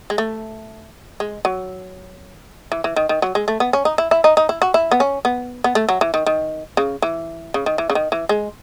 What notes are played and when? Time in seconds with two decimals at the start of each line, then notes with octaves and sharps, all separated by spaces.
0.10 G#3
0.18 A3
1.20 G#3
1.45 F#3
2.72 E3
2.84 E3
2.96 D#3
3.09 D#3
3.22 F#3
3.35 G#3
3.48 A3
3.60 B3
3.73 C#4
3.85 D#4
3.98 E4
4.11 E4
4.24 D#4
4.37 D#4
4.49 E4
4.62 F#4
4.74 E4
4.92 B3
5.00 C#4
5.25 B3
5.64 B3
5.75 A3
5.89 F#3
6.01 E3
6.14 D#3
6.26 D#3
6.77 C#3
7.02 E3
7.54 C#3
7.66 D#3
7.78 E3
7.90 C#3
7.95 D#3
8.12 E3
8.29 G#3